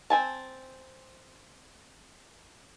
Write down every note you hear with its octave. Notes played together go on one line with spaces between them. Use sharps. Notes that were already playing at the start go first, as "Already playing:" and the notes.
C4 G#5 A5